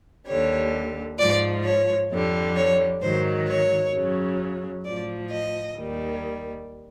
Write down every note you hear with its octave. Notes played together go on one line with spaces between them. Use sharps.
D#2 D3 G3 C#5
G#2 F3 D5
C#5
F2 D3 G3
C#5
G#2 D#3 F#3 C5
C#5
F#2 C#3 F#3
A2 F3 D5
D#5
D#2 D#3 G3